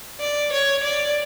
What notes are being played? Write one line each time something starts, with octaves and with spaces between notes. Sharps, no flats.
D5
C#5
D5